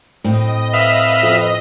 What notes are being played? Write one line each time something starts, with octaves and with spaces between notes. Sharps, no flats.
A2 C4 D#5
B4 E5 F5
F2